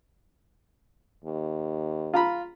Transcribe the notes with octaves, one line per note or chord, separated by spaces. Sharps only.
D#2
F4 A#5 B5